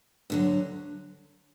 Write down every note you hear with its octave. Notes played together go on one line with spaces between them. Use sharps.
D2 D3 F#3